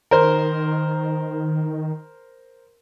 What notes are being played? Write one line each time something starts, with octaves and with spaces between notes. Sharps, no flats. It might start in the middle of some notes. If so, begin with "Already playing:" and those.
D#3 A#4 C5